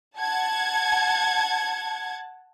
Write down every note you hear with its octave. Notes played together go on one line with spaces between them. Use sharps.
F#5 A5 G#6